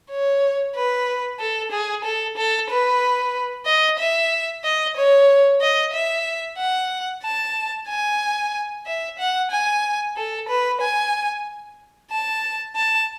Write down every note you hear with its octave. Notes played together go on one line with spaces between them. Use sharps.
C#5
B4
A4
G#4
A4
A4
B4
D#5
E5
D#5
C#5
D#5
E5
F#5
A5
G#5
E5
F#5
G#5
A4
B4
G#5
A5
A5